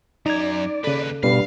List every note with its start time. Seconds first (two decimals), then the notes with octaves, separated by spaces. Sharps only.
0.26 F#2 D#4 D5 A#5 G#6
0.84 D#2 C#3 A4 B4
1.23 G2 B2 B3 F5